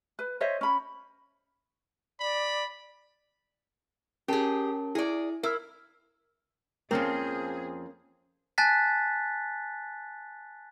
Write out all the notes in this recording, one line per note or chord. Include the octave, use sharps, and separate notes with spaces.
B4
C5 C#5 D#5 E5
C#4 B5
D5 B5
C#4 G4 G#4 A#4 A5
E4 G#4 D5
E4 A#4 E6 F6
F2 F3 A#3 C4 C#4 G#4 A#4
G#5 A5 F#6 A6 B6